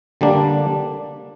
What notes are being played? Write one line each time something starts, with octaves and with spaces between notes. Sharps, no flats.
D3 G3 A#3 D4